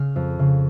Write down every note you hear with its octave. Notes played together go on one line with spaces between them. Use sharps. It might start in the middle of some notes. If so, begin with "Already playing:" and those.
Already playing: C#3 F6
F2
C#3